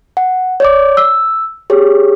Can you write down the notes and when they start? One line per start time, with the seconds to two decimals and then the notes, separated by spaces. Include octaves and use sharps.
0.17 F#5
0.60 C#5 D5 D6
0.97 E6
1.70 G4 G#4 C#5